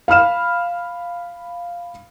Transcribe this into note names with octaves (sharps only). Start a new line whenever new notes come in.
F5 B5 F6 E7